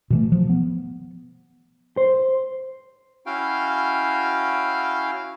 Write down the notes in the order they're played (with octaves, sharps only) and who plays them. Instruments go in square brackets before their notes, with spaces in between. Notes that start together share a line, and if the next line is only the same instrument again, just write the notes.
[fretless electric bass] B2 E3 A3
F3
B3
[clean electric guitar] C5
[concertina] C#4 E4 F#4 F5 G5